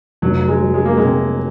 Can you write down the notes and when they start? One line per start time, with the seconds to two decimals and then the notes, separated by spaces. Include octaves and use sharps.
0.22 F1 F#3
0.48 G#3
0.61 F#3
0.74 G#3
0.86 A#3
0.97 C3 G#3